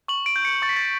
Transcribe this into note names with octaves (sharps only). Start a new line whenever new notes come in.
C#6 F#7
D7
G6
C#7
C#6 A6
B6
A6